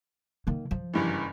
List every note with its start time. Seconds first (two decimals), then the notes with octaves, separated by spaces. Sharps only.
0.47 D#3 A#3
0.71 F3
0.93 F#1 G2 E3